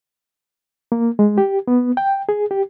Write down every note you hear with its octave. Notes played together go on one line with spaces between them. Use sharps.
A#3
G#3
G4
B3
G5
G#4
G4